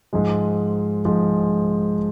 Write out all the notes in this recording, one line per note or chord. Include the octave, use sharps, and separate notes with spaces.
G#2 F3 G#3
G#2 F3 G#3